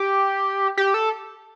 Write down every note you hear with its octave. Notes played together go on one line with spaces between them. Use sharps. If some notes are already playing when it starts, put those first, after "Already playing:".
Already playing: G4
G4
A4